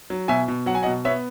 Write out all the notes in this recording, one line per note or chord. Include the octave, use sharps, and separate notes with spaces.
F#3
B2 E5 G#5
B2
F#3 F#5
G#5
B2 D#5 F#5
B3 C#5 E5